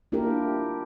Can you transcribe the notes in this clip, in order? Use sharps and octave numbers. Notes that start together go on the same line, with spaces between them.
A#3 D4 E4 F4 G4 A#4